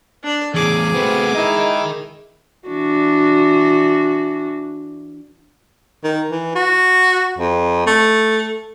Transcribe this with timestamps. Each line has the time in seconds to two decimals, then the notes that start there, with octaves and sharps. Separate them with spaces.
0.23 D4 D5
0.54 E2 A2 G#4 D6
0.94 A3 B3 C4 F#4 B4
1.35 G#3 D#4 E4 A#4 D#5
2.68 E3 D4 F#4
6.04 D#3
6.31 E3
6.55 F#4
7.39 F2
7.87 A3